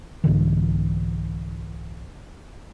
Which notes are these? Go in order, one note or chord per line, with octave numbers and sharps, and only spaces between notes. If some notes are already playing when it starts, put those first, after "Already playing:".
C2 G#2 D3 E3